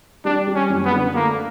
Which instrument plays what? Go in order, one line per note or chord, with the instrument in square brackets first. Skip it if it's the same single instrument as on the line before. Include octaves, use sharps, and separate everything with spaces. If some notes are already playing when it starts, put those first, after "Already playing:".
[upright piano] G3 [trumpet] D4
[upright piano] G3
[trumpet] C#4
[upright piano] F#2
[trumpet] B3
[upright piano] D3
[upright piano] A3 [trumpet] A#3